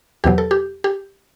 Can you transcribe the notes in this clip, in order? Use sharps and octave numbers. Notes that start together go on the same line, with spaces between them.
E2 B2 F#3 G4
A4
G4
G4